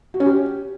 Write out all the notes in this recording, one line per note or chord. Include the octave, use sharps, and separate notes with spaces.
F#4
C#4
G4